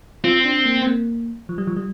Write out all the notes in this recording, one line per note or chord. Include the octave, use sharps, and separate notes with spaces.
C4 F4
D4
A#3
C4
A#3
F3
G3
F3
G3